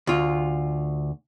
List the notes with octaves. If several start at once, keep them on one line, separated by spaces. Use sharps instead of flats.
D2 F4